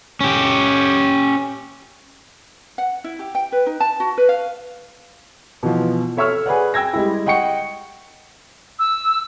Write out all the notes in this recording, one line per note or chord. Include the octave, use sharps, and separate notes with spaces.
C#4 G4
F#5
E4
G4
G5
B4
D#4
A5
F#4
B4
F5
B2 E3 F3
A4 C#5 E5 C#6 E6 F6
G#4 B4 D5 F#5
G5 E6 G#6 A#6
G3 G#3 E4
D#5 F#5 G5 C#6 C#7
E6